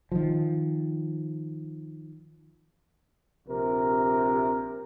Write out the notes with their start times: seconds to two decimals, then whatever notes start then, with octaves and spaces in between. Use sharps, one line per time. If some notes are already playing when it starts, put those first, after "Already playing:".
0.12 D#3 F3
3.47 A#1 C3 A#4